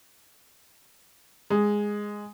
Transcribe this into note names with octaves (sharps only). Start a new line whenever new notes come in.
G#3